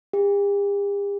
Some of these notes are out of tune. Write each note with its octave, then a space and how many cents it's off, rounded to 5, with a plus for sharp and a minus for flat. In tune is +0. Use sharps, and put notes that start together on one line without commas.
G4 +45